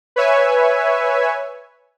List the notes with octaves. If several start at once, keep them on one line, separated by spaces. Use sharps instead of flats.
B4 C#5 E5 G#5